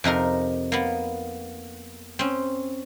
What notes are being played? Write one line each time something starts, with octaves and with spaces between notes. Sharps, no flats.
F2 C3 D#4 A#4
A#3 B3
C4 C#4